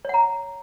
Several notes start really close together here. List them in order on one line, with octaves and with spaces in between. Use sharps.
C#5 F#5 A#5